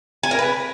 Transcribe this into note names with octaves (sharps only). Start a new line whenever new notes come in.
G#5
A#4
B4